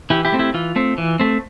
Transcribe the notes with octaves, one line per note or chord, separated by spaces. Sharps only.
E3 E4 G4
E4 G4
A3 C4
E4 G4
E3 F4
A3 C4
E3
A3 C4